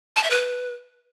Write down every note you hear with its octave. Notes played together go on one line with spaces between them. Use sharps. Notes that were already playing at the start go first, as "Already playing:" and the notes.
A5
E5
B4